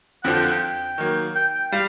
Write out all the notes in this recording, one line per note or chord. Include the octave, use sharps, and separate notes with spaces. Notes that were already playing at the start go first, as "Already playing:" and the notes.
F2 D3 F3 F#5
G5
F#5
G5
D#3 F#3 A#3
G5
G5
G3 F5